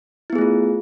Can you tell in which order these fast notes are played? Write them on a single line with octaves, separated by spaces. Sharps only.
E4 B3 G#4 A3 F4